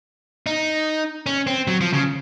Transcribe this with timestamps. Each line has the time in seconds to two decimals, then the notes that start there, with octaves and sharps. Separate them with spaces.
0.46 D#4
1.26 C#4
1.47 C4
1.67 F#3
1.81 F3
1.93 C#3